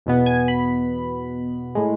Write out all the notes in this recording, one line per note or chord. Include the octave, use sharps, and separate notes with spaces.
E2 B2 B3
G#5
B5
A2 G#3